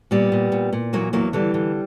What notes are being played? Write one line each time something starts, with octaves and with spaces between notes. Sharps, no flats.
A#2 G3 B3
A#2
A#2
A#2
E2 F#3 A#3
E2 F#3 A#3
D3 E3 G3
D3